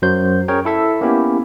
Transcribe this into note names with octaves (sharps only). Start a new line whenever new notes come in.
F#2 F#3 C5 G6
C#4 G#4 A#4 C#5 G5
E4 A4 E5
A#3 B3 C#4 E4 G4